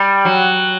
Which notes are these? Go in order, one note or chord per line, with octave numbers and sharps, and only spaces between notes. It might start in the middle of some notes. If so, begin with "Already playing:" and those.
Already playing: G3
F#3